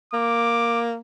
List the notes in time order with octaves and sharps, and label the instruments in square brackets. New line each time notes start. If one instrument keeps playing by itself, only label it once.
[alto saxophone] A#3 [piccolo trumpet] D6